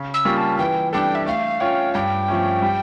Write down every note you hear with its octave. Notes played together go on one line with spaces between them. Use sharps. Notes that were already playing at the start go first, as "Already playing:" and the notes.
Already playing: C#3
E6
G3 A#3 C#4 F4
A5
E3 G5
G3 D4 A4 G5
E5
A3 F5
C#4 F4 C#5 G5
G2 G5
F3 A3 C#4
G3